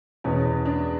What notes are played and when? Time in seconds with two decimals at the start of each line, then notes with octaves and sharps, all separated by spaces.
0.24 E2 B2 C#4
0.45 C#4
0.65 D4